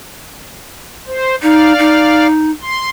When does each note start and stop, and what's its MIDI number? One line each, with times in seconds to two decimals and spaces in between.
1.07 1.35 72
1.42 1.73 63
1.42 2.27 74
1.42 2.27 77
1.79 2.51 63
2.61 2.90 84